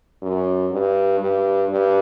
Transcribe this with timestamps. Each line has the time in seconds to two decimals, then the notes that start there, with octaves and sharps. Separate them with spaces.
0.22 F#2
0.71 G2
1.20 G2
1.70 G2